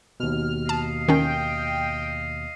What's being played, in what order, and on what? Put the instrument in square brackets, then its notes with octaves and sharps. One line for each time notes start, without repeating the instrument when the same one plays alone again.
[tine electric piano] D#2 B2 [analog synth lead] F6
[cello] D#5 F5 [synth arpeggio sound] A5
[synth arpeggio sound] D#3 C#4 [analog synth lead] G5